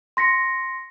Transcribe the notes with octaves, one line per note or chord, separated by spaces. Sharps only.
C6 A#6 B6 C#7